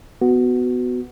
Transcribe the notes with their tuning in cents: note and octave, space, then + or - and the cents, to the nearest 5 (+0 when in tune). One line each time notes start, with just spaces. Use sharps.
B3 +15 F#4 +0